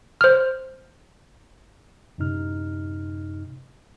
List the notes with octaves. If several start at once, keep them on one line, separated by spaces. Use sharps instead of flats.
C5 F6
F#2 A2 C3 D#4 F6